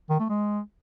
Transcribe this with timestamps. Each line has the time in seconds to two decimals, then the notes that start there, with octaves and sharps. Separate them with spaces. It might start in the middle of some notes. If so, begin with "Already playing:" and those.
0.10 D#3
0.20 A3
0.29 G#3